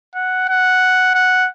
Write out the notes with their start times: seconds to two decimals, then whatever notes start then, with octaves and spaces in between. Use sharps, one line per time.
0.15 F#5
0.49 F#5
1.14 F#5